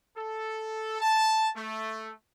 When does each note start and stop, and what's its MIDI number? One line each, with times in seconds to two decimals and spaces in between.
0.17 1.01 69
1.01 1.49 81
1.56 2.11 57